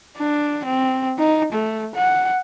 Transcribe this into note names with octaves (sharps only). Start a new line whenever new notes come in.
D4
C4
D#4
A3
F#5